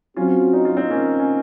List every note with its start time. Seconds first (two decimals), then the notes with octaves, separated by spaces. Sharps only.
0.17 F#3 C4 C#4 F4 F#4
0.53 D#4
0.65 F4
0.76 C4 D#4
0.90 A#3 C#4
1.19 C#4